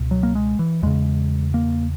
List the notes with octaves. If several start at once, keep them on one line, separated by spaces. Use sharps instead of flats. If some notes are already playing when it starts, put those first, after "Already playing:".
Already playing: C#2 B2
F#3
A#3
G#3
E3
E2 C#3 G#3
A#3